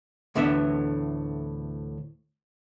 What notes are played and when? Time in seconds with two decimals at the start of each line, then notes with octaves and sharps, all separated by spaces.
0.35 D2 A2 E3 B3 D4 E5